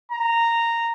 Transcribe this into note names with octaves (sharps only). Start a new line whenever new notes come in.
A#5